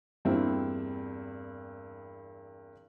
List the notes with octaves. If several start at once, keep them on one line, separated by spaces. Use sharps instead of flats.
E2 G2 A#3 C4 E4